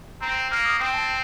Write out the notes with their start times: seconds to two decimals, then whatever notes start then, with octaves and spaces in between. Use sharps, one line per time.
0.21 C4 A#5
0.51 A#3 F6
0.66 D#6
0.80 C4 G5
0.94 A5